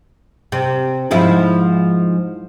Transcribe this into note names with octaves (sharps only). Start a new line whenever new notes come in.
C3
G#2 F3 E4